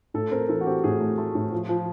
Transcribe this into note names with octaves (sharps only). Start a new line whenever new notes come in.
A2 A4
C4 A#4
E3 A4
F#4
C4 G4
A2 G#4
A3
A3
A2
F3
F3